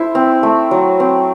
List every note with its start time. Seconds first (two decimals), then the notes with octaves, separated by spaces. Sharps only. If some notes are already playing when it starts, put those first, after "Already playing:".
Already playing: E4 A4 C5
0.15 C4
0.43 A3
0.71 F#3
1.00 C4